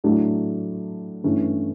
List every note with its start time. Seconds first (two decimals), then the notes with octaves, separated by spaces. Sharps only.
0.04 A2 F#3 A3 D4
1.24 G2 E3 A3 C#4